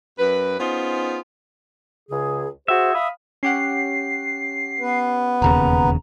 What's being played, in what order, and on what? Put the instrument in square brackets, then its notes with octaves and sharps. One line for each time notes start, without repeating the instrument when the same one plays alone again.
[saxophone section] F#2 B4
B3 C#4 D#4 F4 G#4 C5
[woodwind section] C#2 C#3 G#4
[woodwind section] F#4 G#4 C5 [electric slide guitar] E5
[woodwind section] F5 B5 D#6
[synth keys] C#4 G4 F#5 [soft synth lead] C7
[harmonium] B3 B4
[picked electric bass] E1 D#2 C#3 [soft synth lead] A#5